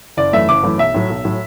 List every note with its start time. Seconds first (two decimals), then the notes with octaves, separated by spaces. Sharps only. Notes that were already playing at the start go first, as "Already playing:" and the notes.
0.17 F#1 D5
0.33 F#2 E3 A3 E5
0.48 F#1 D6
0.63 F#2 E3 A3
0.78 B1 E5
0.94 A2 F#3
1.10 B1
1.25 A2 F#3